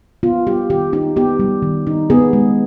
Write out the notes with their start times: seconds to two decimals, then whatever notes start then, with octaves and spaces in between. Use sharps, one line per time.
0.23 B3 F4
0.46 G3 G4
0.70 D#3 G4
0.93 D#4 G4
1.16 B3 G4
1.40 G3
1.63 D#3
1.87 D#4
2.10 B3 G#4
2.33 G#3